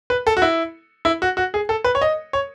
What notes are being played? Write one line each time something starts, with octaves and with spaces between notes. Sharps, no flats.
B4
A4
F#4
E4
E4
F#4
F#4
G#4
A4
B4
C#5
D#5
C#5